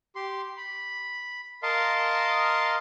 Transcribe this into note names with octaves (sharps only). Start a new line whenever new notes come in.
G4 C6
B5
A#4 D#5 F5 A5 C6